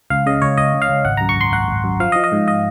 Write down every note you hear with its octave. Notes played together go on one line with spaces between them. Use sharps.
C#2 F5
C#3 D#5
C#2 C#5
C#2 D#5
C#2
F5
C#2
G#1 F#5
F#2 A#5
C#6
G#1 C6
G#1 F#5
G#1
F#2
F3 F5
D#5
F3
D#5
G#2
D#5